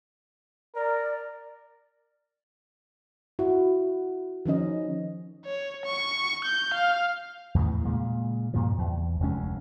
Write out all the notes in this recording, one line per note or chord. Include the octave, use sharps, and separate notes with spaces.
A#4 D5
E4 F#4
D#3 F3 C#4 D#5
C#5
C#6
G6
F5
E2 A2 C#3 E3
A#2 C#3 G#3
G2 A#2 C#3 F3
E2
F1 D2 G#3 C#4